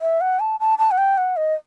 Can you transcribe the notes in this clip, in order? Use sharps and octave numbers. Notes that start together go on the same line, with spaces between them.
E5
F#5
A5
A5
A5
F#5
G5
F#5
D#5